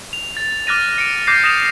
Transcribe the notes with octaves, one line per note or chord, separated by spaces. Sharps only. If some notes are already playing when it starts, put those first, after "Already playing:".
F7
A6
D6 F6 F#6 A6 A#6 D#7
C#7 D7
D6 F#6 G6 A#6 C7
D#6 A#6 E7 F7